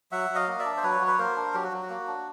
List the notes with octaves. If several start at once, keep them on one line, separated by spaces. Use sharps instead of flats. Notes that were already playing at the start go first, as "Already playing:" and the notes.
F#3 E5 F#5
F#3
D#5 F5
A#3
D5 E5
D4
C5
F#3 B4 C#5
F#3
B4
A#3 A#4 C5
D4
F#3 G4
F#4
F#3
F#4
A#3
D4